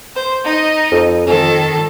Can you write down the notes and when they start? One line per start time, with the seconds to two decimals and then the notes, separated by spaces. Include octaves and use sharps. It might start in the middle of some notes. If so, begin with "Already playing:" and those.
0.15 C5
0.44 D#4 D#5
0.91 F2
1.27 F2 D#3 A4